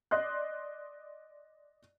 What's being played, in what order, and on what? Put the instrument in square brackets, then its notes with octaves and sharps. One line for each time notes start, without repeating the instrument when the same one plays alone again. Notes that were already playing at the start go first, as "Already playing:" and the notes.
[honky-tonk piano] D5 D#5 C6 F#6